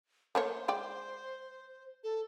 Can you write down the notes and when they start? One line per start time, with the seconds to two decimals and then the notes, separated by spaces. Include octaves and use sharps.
0.35 A3 A#3 C5 C#5
0.68 G#3 D5 G5
2.04 A4